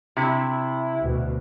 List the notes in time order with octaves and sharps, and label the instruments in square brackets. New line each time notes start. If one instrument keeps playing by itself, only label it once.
[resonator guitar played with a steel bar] C3 [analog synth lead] E4
[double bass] D2 B2